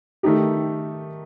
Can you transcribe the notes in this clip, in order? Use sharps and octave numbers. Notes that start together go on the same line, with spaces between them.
D#3 A3 D#4 G4